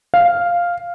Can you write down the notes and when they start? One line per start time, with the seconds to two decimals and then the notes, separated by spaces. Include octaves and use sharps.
0.14 F5